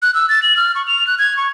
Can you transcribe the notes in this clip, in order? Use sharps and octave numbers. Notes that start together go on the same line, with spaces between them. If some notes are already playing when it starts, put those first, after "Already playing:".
F#6
E6
A6
F#7
F6
C#6
F7
F#6
G#6
C#6